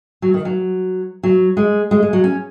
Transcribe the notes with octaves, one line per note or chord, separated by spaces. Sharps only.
F#3
D#3
F#3
F#3
G#3
G#3
G#3
F#3
C#4